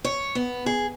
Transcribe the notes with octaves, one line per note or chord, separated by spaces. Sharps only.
C#5
B3
G#4